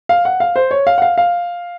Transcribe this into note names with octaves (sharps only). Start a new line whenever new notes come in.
F5
F#5
F5
C5
C#5
F5
F#5
F5
F5